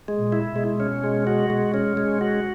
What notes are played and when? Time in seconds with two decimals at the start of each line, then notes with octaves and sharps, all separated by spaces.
0.08 G#3
0.17 A#2
0.32 E4
0.49 B2
0.56 G#3
0.80 C#4
1.04 G#3
1.27 F#4
1.50 G#3
1.74 C#4
1.97 G#3
2.21 F#4